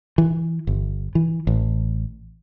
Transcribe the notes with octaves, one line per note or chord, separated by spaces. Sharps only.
E3
G1
E3
A1